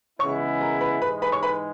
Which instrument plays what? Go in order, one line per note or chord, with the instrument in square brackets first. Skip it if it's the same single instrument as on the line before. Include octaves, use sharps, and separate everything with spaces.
[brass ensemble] C#3 E3 G#3 B3 E4 [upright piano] C#5 C#6
[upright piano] A#4 A#5
B4 B5
[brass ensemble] G#2 E3 G#3 [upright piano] B4 B5
[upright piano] B4 B5
C#5 C#6
B4 B5